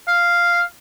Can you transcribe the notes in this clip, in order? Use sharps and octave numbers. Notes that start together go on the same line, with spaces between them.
F5